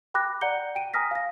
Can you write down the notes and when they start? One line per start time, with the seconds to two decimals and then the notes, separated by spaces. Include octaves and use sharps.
0.14 G5 B5 D6 F#6 A#6
0.41 D5 F#5 A#5 G6 C#7 G7
0.75 G5 D7 D#7
0.93 G#5 A#5 D#6 F6 A#6 B6
1.11 F5 A#6